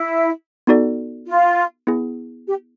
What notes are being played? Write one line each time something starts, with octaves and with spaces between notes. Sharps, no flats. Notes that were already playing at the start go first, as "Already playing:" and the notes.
Already playing: E4
B3 D#4 F#4 A4 D5
F4
B3 E4 G#4
G4